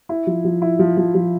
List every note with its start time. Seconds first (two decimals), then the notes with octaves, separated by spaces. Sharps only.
0.09 E4
0.27 F3
0.45 F3
0.62 E4
0.79 F3
0.97 F3
1.15 F3